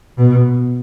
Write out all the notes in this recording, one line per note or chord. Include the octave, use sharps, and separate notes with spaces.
B2